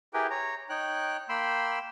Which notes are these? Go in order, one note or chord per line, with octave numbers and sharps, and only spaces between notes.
E4 G4 G#4 A#4 B4 G5
C#5 A#5
D#4 C#5 G5 F#6
A#3 G5 B5 C6 E6